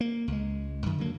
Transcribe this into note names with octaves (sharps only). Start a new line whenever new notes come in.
A#3
C#2 G#3
F#2 D#3
D3 F#3 A#3